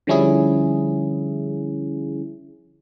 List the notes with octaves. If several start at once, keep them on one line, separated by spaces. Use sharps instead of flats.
D3 F3 G3 C#4 E4 G#4